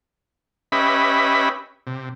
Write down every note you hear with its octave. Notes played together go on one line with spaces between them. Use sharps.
C#4 G4 B4 D#5 E5 B5
C3